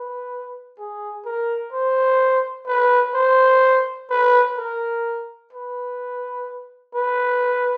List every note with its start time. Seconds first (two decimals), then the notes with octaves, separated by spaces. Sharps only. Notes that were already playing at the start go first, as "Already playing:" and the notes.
Already playing: B4
0.79 G#4
1.25 A#4
1.73 C5
2.67 B4
3.15 C5
4.10 B4
4.58 A#4
5.53 B4
6.95 B4